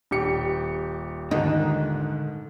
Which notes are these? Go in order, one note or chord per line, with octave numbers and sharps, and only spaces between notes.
D#1 G4 C#7
G#2 D3 D#3 D#4